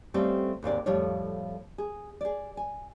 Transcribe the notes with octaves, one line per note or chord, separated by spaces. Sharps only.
G3 A3 C4 C#4 A4 F5
D#2 G#2 C3 D5
F2 A2 F3 G3 C#5
G#4
G#4 D5
G#5